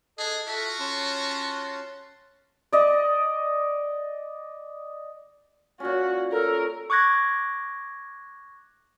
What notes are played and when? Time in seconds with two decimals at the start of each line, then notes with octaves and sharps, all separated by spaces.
0.18 D4 G#4 A4 D#5
0.48 F4 F#4 A4 E5
0.80 C#4 A5 C6
2.72 D5 D#5
5.80 A#2 C#4 F#4
6.32 A4 A#4
6.90 C#6 D6 F#6 G#6 A#6